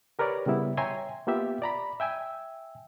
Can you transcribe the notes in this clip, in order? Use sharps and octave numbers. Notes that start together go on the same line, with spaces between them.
G4 A#4 B4 C#5 D5
C#3 G3 B3 E4
C#5 E5 G5 G#5 A#5 C6
A#3 B3 F4 G4 E5
D5 A#5 B5
E5 G5 G#5 E6